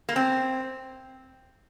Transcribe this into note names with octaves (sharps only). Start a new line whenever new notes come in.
A#3
C4